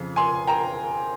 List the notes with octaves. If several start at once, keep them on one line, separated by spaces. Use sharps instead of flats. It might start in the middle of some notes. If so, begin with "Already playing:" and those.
Already playing: F2 C#3 F3
G#5 C6
G5 A#5